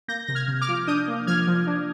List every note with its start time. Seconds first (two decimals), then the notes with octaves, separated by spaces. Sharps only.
0.08 A#3 G6 A#6
0.27 C3 A#6
0.35 F6 G#6
0.48 C3
0.61 D6 F6
0.68 F3
0.87 D4 D#6 G6
1.08 A#3
1.27 F3 F6 G#6
1.47 F3
1.67 D4